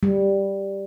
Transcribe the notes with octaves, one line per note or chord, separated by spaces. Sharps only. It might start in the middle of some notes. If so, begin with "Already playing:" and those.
G3